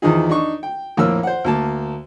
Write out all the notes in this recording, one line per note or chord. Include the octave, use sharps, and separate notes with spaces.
E2 D#3 F3 D#4 G#4
D4 D#4 C#6
G5
A#1 F2 A2 A#3 A#4 E6
C5 F#5
D2 A#3 A5